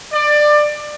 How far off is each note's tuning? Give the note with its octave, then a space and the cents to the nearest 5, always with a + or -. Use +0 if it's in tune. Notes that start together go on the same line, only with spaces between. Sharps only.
D5 +20